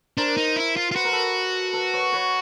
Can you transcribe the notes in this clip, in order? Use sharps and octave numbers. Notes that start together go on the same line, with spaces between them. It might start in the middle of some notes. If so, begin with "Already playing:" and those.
D4 A#4 C5
D#4
E4
F4
F4
F#4 B4
A#4
A4 B4
A4 B4
B4 C#5
B4 C#5